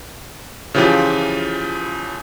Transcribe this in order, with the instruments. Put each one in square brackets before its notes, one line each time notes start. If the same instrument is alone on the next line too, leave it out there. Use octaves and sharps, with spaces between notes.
[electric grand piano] C#3 E3 F3 F4 G4